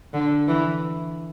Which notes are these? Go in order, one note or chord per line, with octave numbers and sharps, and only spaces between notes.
D3
E3